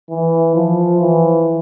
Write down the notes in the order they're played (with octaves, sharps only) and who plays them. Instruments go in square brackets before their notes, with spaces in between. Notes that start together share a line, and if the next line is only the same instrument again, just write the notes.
[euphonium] E3
F3
E3